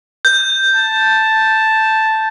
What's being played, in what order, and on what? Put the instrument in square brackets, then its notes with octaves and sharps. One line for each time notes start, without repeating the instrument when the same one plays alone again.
[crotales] G6
[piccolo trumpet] A5